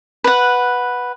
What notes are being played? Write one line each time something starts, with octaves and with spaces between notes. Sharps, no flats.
B4 F#5